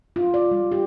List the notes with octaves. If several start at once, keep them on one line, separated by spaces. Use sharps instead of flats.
F4
D5
G3
G4